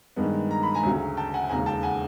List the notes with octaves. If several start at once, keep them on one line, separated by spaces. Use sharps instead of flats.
G2 D#3 G#3 B3
A#5
B5
G#5 A#5
D2 C#3 F#3
G5 A5
F#5 G#5
E1 D#2 C#3 G#5 A#5
G5 A5
F#5 G#5